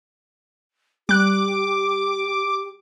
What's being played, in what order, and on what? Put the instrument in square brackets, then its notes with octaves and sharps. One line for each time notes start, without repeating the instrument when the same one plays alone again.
[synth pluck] G3 F#6 [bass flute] G4 [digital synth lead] D6